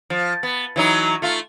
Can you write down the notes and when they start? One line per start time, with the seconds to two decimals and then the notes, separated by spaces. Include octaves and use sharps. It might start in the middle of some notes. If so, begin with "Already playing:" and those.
0.10 F3
0.43 B3
0.76 E3 F#3 D#4
1.22 A3 F4